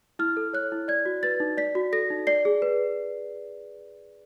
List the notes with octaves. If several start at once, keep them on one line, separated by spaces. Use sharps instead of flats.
E4 F6
A4
C#5 F#6
E4
D5 G#6
F#4
B4 A6
D#4
D5 B6
F#4
A4 A#6
D#4
D5 C7
G#4
B4